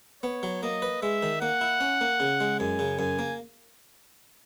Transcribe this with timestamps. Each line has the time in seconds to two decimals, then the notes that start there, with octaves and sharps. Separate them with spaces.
0.23 B3 C#5
0.43 F#3
0.63 A#3 D#5
0.82 B4
1.02 G#3 E5
1.22 D#3
1.41 A#3 F#5
1.61 E4
1.80 C#4
2.01 A#3
2.20 C#3
2.40 G#3
2.60 F#2 G#5
2.79 C#3
2.99 F#2 G#5
3.19 A#3